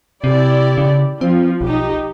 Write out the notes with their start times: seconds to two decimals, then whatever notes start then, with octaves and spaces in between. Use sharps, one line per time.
0.24 C3 E4 G4 D5
0.78 C#3
1.21 F3 C4
1.61 B1 D#4 G4